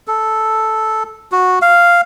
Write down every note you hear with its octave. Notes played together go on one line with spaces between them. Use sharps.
A4
F#4
F5